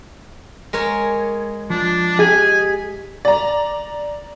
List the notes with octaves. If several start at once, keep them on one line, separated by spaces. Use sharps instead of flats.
G#3 A#4 C#5
F3 D4
G4 G#4 D#5 G#5
D5 A#5